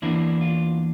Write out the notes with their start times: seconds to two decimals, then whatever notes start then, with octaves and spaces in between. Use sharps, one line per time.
0.02 E2 E3 A#3 D4 E4
0.41 F4